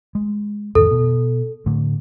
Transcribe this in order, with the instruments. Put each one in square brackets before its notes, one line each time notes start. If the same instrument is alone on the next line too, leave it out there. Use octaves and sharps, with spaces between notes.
[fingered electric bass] G#3
[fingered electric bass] F2 A2 D#3 [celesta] A4
[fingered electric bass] B2
A2 D3 A3